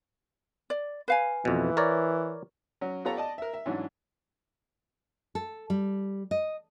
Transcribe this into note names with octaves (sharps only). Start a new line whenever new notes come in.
D5
B4 F5 G#5
F2 B2 E3
A#4 C#5 D5
F#3 C#4
B3 F4 G4 A4 C#5 A#5
D5 D#5 A5
A#4 E5
E5
G#2 E3 F#3 C#4 D4
A4
G3
D#5